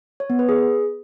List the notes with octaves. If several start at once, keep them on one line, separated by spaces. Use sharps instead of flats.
C#5
B3
B4
G#4